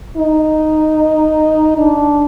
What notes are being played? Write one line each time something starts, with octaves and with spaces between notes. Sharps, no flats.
D#4
D4